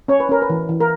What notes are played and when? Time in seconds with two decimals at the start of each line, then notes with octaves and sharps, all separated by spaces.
0.08 C#4 C#5
0.20 B4
0.29 C#4 A#4
0.42 B4
0.50 E3
0.69 E3
0.80 A#4